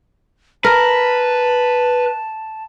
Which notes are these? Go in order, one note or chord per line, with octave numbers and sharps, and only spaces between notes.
A#4 B4 A5